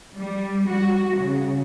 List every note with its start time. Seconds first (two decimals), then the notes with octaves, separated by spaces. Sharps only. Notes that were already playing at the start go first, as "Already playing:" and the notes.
0.15 G3
0.68 F#4
1.15 C#3